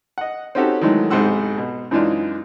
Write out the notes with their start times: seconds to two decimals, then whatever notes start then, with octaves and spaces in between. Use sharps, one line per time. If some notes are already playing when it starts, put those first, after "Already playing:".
0.18 D#5 F#5
0.55 C4 C#4 D#4 F#4 G4 A4
0.81 D#3 E3 F#3 G#3 A3
1.10 B1 G#2 C3 C5 F#5 E6
1.58 B2
1.91 F#2 E3 G#3 D4 D#4 F4